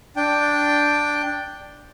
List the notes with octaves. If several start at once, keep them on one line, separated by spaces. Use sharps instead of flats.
D4 G5